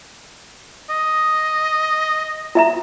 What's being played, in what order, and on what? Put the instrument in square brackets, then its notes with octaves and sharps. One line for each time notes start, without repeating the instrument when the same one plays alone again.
[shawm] D#5
[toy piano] E4 E5 A#5